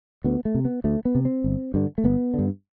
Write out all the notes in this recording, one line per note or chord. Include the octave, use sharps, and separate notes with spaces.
D2 B3
A3
C3
B3
D2 A3
B3
C3
C4
G1
G2 D3
A3
G1 B3
G2 D3